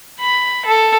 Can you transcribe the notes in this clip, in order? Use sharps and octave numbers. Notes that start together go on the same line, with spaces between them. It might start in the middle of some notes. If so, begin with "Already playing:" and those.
B5
A4